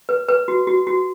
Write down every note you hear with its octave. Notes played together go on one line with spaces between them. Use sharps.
B4
B4
F#4
F#4
F#4